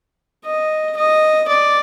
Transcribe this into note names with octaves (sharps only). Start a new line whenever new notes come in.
D#5
D#5
D5